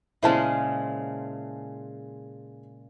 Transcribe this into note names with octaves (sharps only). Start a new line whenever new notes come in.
A#2 C#3 G#3 E4 C5 A5